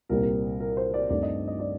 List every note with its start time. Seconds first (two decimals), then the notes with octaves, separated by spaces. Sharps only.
0.09 C2 A#2 G3 C4 A#4
0.60 A#4
0.77 C5
0.94 D5
1.10 G2 D#3 A3 C4 D5
1.23 D#5
1.47 D#5
1.59 D5